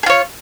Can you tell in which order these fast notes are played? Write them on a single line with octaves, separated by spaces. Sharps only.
G#4 F4 C#5